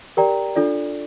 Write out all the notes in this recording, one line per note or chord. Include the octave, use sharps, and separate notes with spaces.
G4 A#4 D5 G5 A#5
D4 F4 A4 D5